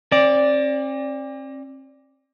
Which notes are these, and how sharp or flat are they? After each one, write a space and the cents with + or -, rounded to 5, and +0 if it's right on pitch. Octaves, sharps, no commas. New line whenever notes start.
C4 +45 D5 +0